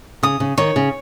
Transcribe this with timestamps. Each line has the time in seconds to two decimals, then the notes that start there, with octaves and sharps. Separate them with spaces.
0.23 C#3 D#6
0.40 C#3
0.58 D#3 C#5
0.76 C#3